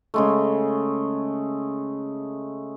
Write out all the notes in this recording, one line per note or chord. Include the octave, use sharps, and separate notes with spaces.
C#3 G#3 A3